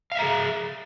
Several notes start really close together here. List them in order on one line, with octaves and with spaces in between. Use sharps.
F5 E5 A#5 G#4